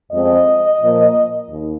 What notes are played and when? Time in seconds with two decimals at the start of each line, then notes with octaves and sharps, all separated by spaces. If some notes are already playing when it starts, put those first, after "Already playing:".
0.11 F2 F3 G#3 C4 D#5
0.81 A#2 F3 A#3
1.49 D#2